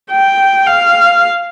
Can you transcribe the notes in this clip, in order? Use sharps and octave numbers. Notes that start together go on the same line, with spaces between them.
G5
F5